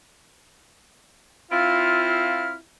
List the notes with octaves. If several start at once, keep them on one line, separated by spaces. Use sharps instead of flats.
C4 E4 F4 F6